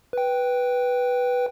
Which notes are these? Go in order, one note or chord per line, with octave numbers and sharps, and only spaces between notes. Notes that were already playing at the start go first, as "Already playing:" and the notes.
B4 G5